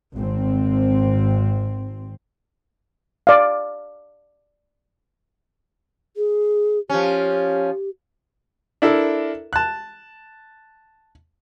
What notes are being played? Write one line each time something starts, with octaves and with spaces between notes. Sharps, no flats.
G#1 C4
D5 F5
G#4
F3 C#4 G4
D4 E4 A4 A#4
A5 F#6